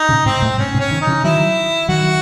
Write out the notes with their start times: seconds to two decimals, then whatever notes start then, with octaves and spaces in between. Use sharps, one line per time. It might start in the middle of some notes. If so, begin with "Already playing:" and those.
Already playing: D#4
0.09 A2 C#3
0.26 G#2 C3 C4
0.42 F#2 A2
0.58 G#2 C3 C#4
0.74 G#2 C3
0.80 C#4
0.90 C3 D#3
1.01 D#4
1.07 C#3 E3
1.23 D#3 F#3 E4
1.89 D#3 F#3 F#4